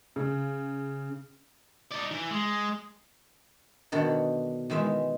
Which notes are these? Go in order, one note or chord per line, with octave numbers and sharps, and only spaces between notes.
C#3
D#4 D5
E3
G#3
B2 D3 D#3
D#3 E3 G#3 E5